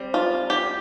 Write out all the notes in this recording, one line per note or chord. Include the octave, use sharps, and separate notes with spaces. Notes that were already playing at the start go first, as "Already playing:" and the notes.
Already playing: G3 C4
F4
G4